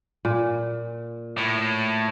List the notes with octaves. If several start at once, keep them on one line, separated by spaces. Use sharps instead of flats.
A#2
A2